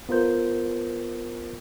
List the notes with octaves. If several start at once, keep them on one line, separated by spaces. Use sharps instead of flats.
B3 F4 A#4 C5 G6